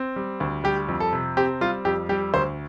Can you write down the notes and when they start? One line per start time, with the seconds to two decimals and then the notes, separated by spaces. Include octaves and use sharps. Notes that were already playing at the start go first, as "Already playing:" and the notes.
Already playing: C4
0.16 G3
0.40 D2
0.64 G3 G4
0.88 F2
1.00 A4
1.13 C3
1.37 C4 G4
1.61 G3 F4
1.85 F2 G4
2.09 G3 G4
2.34 D2 C5